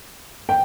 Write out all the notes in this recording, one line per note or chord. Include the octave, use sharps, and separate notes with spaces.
G5